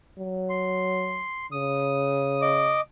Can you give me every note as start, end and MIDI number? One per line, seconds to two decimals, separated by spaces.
0.19 1.23 54
0.50 1.46 84
1.52 2.82 49
1.52 2.41 87
2.42 2.81 75
2.42 2.81 86